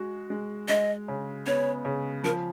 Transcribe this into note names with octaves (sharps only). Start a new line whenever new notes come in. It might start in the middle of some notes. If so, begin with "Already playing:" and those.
Already playing: G#3 F#4
G#3
G#3 D#5
C#3
B3 C#5
C#3
F3 A#4